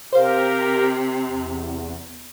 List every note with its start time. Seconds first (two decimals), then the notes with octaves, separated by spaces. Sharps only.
0.13 C3 G4 A#4 C5 F5
1.27 E2